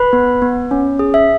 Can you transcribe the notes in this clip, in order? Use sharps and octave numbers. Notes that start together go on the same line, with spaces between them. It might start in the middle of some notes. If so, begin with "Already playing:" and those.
Already playing: B4 B5
B3
B3
C#4
G#4
E5